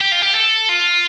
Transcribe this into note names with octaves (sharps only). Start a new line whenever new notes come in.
G4
F4
G4
A4
F4